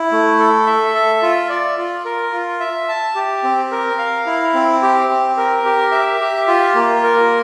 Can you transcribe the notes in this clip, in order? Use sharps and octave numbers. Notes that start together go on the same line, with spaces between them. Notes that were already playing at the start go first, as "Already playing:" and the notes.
Already playing: E4
A3
A4
E5
A4
F4
D5
F4
A#4
F4
E5
A5
G4
C4
A#4
F5
E4
C4
G4
C4
A#4
G4
E5
G4
F4
A#3
A#4